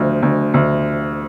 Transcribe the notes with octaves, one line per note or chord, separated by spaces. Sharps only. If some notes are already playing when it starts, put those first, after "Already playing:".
Already playing: D2 F3
D2
D2